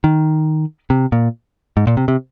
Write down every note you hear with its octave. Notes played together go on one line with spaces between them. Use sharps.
D#3
C3
A#2
G#2
A#2
C3
C3